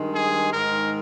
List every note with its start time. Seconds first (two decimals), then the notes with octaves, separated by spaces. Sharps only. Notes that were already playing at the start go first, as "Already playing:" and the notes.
Already playing: G2 D#3 G#3
0.15 G#4
0.53 G#2 D#3 G#3 A#4